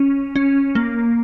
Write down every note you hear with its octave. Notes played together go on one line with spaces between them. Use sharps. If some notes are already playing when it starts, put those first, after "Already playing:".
Already playing: C#4
C#4
A#3